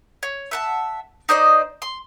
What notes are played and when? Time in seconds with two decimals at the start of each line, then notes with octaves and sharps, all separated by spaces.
0.23 C#5
0.51 E5 F#5 A5
1.29 D#4 C5 D5 D#5
1.82 C6